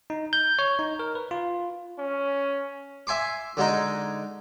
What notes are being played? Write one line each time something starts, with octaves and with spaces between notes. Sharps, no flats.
D#4
G6
C#5
D#4
A#4
B4
F4
C#4
E5 G#5 C6 D6
D3 G#3 D#4